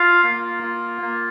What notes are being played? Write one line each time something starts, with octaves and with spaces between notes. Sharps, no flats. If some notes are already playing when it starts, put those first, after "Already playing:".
Already playing: F4 F5
A#3
F4
A#3